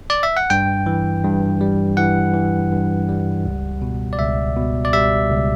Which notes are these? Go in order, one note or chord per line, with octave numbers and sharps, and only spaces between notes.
D5
E5
F#5
G2 G5
E3
G2
G3
E3 F#5
E3
G2
G3
C#2
B2
D5
C#2 E5
B2
D5
G3 E5
C#2